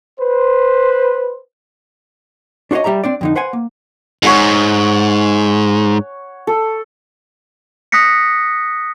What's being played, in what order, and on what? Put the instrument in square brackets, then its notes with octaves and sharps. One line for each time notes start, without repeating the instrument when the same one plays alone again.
[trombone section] B4 C5
[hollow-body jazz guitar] D4 F#4 C5 C#5 D#5
G3 G4 E5 A#5
C4 D4 D5
F2 D3 D#4
B4 C5 F#5 G#5
A#3
[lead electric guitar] G#2 [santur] C#5 F#5 G#5
[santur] A4
[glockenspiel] D#6 F#6 A#6 B6 C#7